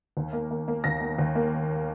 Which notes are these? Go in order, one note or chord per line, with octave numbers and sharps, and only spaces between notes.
D#2
A#3
A#3
A#3
D#2 A#6
A#3
D#2
A#3